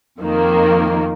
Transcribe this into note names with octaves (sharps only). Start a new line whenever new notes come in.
F2 D#3 A#3